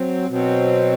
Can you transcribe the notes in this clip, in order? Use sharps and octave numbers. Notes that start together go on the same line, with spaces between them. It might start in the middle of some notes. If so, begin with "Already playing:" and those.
Already playing: F#3 C4
B2 F#3 C4